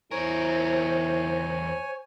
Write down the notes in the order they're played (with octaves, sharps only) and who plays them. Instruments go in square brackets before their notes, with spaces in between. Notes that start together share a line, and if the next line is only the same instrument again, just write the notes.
[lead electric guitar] E2 A#4 [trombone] E4 [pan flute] C5 [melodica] C#5 G#5